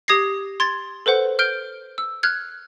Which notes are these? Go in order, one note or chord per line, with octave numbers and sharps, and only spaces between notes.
G4 D#6 G#6 A#6 C7
C6 G#6 A6
A4 B4 C5 F#5
F6 G6 D7 G7
E6
F6 F#6 G#6